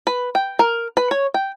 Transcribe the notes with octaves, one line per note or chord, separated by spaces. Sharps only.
B4
G5
A#4
B4
C#5
G5